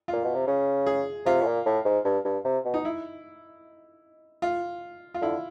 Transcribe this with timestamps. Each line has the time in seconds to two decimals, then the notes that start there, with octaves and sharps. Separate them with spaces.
0.08 A#2 F4
0.24 B2
0.35 C3
0.47 C#3
0.86 G#4
1.26 C3 F4
1.42 A2
1.46 A#2
1.66 A2
1.85 G#2
2.05 G2
2.25 G2
2.45 C3
2.65 B2
2.74 D#4
2.85 E4
4.42 F4
5.14 F4
5.21 D3 E4